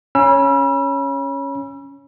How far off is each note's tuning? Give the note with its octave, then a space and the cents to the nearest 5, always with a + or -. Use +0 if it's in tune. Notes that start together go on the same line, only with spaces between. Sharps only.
C#4 +0 B5 -35 E6 +35